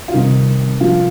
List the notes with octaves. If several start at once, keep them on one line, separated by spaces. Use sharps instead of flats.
F4
C3 D#3 G3 C4 D#4
F3 F4